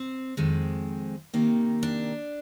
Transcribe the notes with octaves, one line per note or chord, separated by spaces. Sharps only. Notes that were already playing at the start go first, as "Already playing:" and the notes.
Already playing: C4
F2 D#3 G#3 C4
C3 D#3 A#3
D4